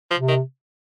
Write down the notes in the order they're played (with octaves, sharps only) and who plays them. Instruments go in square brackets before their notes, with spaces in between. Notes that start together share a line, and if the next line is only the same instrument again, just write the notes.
[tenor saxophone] F3
[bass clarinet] C3
[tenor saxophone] D#3